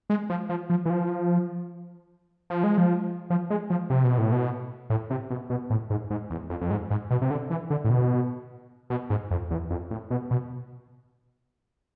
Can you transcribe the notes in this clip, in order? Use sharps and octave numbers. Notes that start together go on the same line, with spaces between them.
G#3
F3
F3
F3
E3
F3
F3
G#3
F3
F3
G#3
F3
C3
B2
A2
B2
A2
C3
B2
B2
A2
G#2
G#2
E2
F2
F2
G#2
G#2
B2
C3
D3
E3
D3
A2
B2
B2
G#2
F2
E2
F2
A2
B2
B2